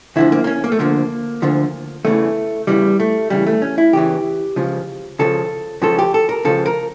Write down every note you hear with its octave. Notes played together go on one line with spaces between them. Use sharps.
D2 D3 F3 E4
A#3
A#3
C#4
A#3
A3
D2 D3 F3 A#3
D2 D3 F3
E2 C#3 E3 A3
E2 C#3 E3 G3
A3
E2 C#3 E3 G3
A3
C#4
E4
E2 C#3 E3 G4
C#2 C#3 F3
C#2 C#3 F3 A4
C#2 C#3 F3 A4
G4
A4
A#4
C#2 C#3 F3 A4
A#4